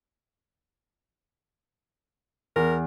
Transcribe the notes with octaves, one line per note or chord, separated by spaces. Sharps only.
E2 A#4